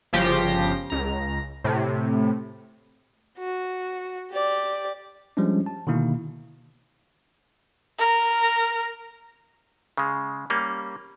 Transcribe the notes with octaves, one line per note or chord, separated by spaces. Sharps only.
G1 C#3 F3 G4 C6 A#6
C#2 A#5
A2 C3
F#4
G4 D5
F3 G3 G#3 C#4 D4
A5
B2 D3 D#3 A#3 E4
A#4
C#3 G#3
G3 A#3 C#4